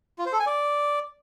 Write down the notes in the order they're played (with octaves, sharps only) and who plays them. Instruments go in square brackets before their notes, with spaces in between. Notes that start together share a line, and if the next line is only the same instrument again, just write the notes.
[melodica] F4
C5
A4
G#5
D5